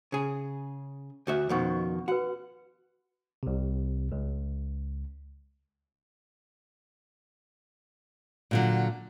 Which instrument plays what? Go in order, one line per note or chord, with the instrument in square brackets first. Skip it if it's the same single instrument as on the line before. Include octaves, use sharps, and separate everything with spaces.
[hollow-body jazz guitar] C#3 G#4
D2 F#4 E5
[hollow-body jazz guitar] F2 B2 D#3 [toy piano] C#4 F#5 C#6
[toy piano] F#4 B4 [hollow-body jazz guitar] F#5
[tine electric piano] C2 C3
C#2
[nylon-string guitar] A#2 D3 F#3